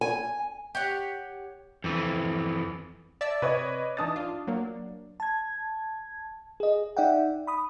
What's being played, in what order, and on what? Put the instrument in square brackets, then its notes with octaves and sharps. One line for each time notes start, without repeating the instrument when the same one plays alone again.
[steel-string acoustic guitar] G#5
[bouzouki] G4 C#5 F#5
[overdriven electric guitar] F2 E3
[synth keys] D5 [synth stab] E5 A5 E6
[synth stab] C3 [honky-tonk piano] B4 C#5 D#5
[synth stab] E3 D4 D#4 [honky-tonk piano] A5 D#6 A6
[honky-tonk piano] D4 [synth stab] F4
[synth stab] F#3 A#3
[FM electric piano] A5 G#6
G#4 D#5
D#4 D5 E5 F#5 G5
B5 D#6